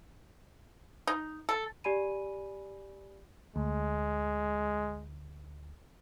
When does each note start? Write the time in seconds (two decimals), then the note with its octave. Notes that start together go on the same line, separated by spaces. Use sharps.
1.07 D#4
1.49 A4
1.84 G4 D5 G#5 B5 D#7
3.56 D2 G#3